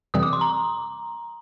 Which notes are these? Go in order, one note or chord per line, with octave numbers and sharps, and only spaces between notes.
F2 C3 E3 G3 C4 D#6
D6
C6
A#5